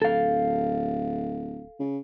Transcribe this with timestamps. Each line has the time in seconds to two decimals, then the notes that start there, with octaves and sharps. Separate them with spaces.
0.02 D1 A4 F5
1.80 C#3